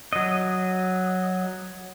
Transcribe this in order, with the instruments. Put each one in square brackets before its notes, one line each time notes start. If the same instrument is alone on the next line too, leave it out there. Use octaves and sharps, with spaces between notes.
[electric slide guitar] F#3 D#5